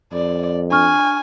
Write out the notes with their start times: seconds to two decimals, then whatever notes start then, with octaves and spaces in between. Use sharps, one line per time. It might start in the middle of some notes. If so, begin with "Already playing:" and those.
0.12 F2 D5
0.71 D4 G#5 C#6 F6